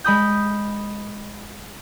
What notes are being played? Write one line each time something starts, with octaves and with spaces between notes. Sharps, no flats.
G#3 B5 D#6 G6